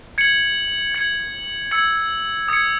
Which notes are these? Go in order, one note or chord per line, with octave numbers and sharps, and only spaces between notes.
G#6 C#7 F#7
G#6 C#7 F#7
E6 G#6 C#7 F#7
D#6 G#6 C#7